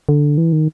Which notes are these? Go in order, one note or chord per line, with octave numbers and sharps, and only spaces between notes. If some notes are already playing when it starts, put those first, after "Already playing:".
D3
E3
D#3